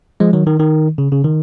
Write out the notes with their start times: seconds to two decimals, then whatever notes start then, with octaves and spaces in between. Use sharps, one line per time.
0.20 F3 G#3
0.33 D#3 F#3
0.47 D#3
0.60 D#3
0.98 C#3
1.12 C#3
1.25 D#3